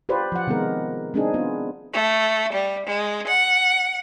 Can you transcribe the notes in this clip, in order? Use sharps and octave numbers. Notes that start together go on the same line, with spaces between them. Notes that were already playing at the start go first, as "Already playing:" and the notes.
F4 G4 B4 C5 D5
F3 F#5
C3 D#3 G#3 B3 A#4
G#3 C4 D4 D#4 G#4
B3 F4
A3
G3
G#3
F#5